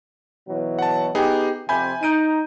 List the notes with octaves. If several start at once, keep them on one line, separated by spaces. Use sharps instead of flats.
B2 E3 F#3
F#5 A5
B3 D#4 G4 G#4
F2 C3 G#5 B5 G6
D#4 G6 D7 D#7